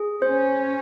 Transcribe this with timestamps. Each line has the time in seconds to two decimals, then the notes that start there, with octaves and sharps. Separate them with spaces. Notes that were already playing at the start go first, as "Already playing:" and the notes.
Already playing: G#4
0.22 C#4 C5